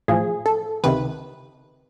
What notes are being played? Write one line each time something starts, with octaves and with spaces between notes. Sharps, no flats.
A1 A2 F3 G#4
A4
C#2 C3 D#3 B4